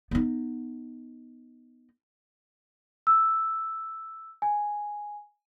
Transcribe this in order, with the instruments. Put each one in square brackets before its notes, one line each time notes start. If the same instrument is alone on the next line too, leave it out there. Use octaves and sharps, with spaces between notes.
[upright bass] B3 D#4
[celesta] E6
G#5